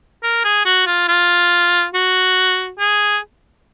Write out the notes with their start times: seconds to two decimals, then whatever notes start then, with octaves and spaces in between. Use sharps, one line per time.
0.23 A#4
0.44 G#4
0.66 F#4
0.87 F4
1.08 F4
1.94 F#4
2.79 G#4